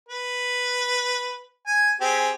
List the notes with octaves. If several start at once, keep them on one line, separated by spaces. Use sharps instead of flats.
B4
G#5
C4 G4 G#4